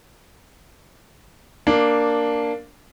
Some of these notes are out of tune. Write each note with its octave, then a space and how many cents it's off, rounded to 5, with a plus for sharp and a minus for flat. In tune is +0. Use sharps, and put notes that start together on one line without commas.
A#3 +0 D4 +0